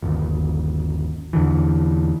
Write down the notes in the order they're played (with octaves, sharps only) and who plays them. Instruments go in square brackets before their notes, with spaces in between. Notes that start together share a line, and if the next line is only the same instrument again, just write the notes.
[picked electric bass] G1 D#2
E2 D3 E3